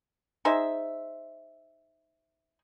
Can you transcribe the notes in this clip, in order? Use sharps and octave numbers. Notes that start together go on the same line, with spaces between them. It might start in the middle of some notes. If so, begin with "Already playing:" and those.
D#4 G#4 C5 E5